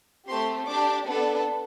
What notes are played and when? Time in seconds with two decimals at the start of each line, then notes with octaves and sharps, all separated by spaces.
0.27 A3 C4 G4 C6
0.67 D4 G4 D6
1.06 B3 D4 A4